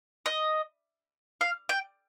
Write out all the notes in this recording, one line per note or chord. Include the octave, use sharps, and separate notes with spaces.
D#5
F5
G5